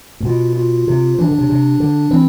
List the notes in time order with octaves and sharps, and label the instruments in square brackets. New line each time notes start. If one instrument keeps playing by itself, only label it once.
[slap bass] A2
[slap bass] B2 [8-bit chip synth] F4
[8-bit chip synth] F4
[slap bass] C3
[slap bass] E3 [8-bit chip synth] D4
[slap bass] D3
C3
C3
D3
[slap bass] E3 [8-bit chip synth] C4